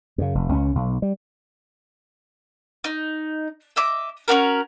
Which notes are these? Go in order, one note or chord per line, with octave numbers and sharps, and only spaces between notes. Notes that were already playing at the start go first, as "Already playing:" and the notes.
F#2 C#3
F1
C#2 C#4
B1
G3
D#4
D#5 E5 D6
C#4 D4 F#4 A#4